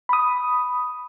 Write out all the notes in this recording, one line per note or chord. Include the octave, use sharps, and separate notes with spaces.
B5 D#6